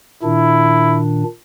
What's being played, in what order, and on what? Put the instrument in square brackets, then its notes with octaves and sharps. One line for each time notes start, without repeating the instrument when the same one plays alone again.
[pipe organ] A#2 D#3 D4 [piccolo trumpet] E4